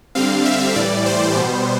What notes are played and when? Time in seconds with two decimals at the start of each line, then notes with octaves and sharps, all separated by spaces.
0.15 D3 G3 C4 F5
0.45 E5
0.76 A2 E3 G3 D5
1.06 C5
1.36 B2 G3 B3 C5